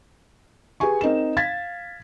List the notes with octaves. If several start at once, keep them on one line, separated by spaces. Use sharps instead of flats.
G4 G#4 B4 G#5 C#6
C4 D#4 A#4 E7
F5 G#6 A6 B6